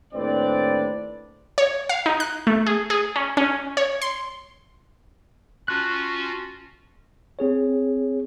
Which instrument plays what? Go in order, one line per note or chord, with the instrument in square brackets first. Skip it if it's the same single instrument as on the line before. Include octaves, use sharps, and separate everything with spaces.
[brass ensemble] D#2 A2 C4 D4 B4 D5
[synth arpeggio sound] C#5
F5
D#4
F#6
A3
G#4
G#4
C#4
C#4
C#5
C6
[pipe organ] C#4 F4 F#4 [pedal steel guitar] A5 F#6
[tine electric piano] C4 G#4 C#5